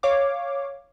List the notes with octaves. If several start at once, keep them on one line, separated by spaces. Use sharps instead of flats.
C#5 F5 D6